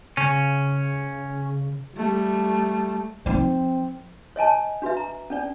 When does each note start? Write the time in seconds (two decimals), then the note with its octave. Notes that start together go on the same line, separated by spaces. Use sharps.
0.17 C#3 C#4
1.96 G3 A3
3.26 F3 C4 D#4
4.36 C#5 D#5 G#5 A5
4.82 D4 F#4 B4 E5
4.97 A#5
5.30 C#4 D4 D5